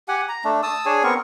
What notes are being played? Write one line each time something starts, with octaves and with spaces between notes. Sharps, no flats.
G4 F#5 G#5
A#5
A3 D4
A5 D#6 E6
D4 G#4 C#5 G#5
B3 C4 A#4 C#6